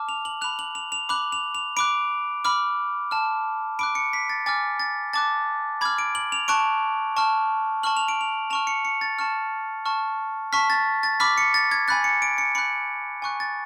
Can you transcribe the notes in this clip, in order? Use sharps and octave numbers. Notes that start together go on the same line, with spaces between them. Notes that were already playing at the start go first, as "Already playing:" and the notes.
Already playing: A5 D6 F6
F7
F#7
B5 F#6 F7
F#7
F7
F7
B5 D6 F#6 F#7
F7
F7
B5 D6 F#6 D7
B5 D6 F6
A5 F6
B5 D6 F#6 D7
C#7
B6
A6
G#5 D6 F6 A6
A6
A5 D6 F#6 A6
B5 D6 F6 G#6
D7
F#7
F7
A5 C#6 F#6 D7
A5 C#6 F6
A5 C#6 F6 F#7
F7
D7
F7
A5 C#6 F6 F7
C#7
C#7
A6
A5 C#6 F6
A5 C#6 F6
A5 C#6 F6 B6
A6
A6
B5 D6 F6 B6
C#7
A6
G#6
G#5 B5 F#6 A6
C#7
D7
C#7
B5 F#6 C#7
G#5 C#6 F#6
A6